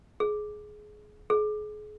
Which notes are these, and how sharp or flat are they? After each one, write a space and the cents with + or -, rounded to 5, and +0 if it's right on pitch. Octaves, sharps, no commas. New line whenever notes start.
G#4 +20
G#4 +35